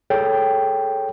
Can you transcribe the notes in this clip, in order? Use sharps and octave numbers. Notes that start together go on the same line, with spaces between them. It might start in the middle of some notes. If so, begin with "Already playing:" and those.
G#4 A4 C#5 G5